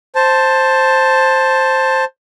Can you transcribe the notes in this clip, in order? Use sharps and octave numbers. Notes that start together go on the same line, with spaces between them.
C5 A5